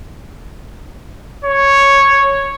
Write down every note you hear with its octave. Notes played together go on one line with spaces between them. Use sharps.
C#5